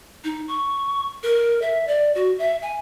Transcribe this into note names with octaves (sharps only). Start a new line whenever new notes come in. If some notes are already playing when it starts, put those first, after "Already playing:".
D#4
C#6
A#4
E5
D5
F#4
E5
G#5